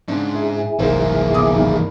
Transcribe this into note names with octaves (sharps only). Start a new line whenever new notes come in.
G#2 C#3 D4
E4 G#4
F#1 C2 G#2 E3 G#3 A#3 A#4 C5
G1 D6 D#6
G2 D#3